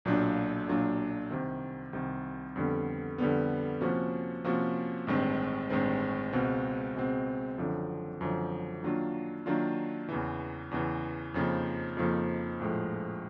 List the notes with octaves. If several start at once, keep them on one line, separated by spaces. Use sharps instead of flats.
B1 A#2 F#3 A#3 D4
B1 A#2 F#3 A#3 D4
C2 C3 D#3
C2 C3 D#3
F2 D3 G3 B3
F2 D3 G3 B3
C3 F3 A#3 C#4 F#4
C3 F3 A#3 C#4 F#4
A1 G2 D#3 G#3 C4
A1 G2 D#3 G#3 C4
C#2 B2 G#3 C4
C#2 B2 G#3 C4
G#1 F#2 D3 F3
G#1 F#2 D3 F3
D#3 F#3 A#3 D4 F4
D#3 F#3 A#3 D4 F4
E2 C#3 E3
E2 C#3 E3
F2 C#3 F3 A#3 D#4
F2 C#3 F3 A#3 D#4
A#1 A2 F3 G#3